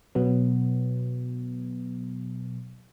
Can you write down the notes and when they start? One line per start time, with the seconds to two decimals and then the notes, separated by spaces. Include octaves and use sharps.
0.15 B2 F#3 B3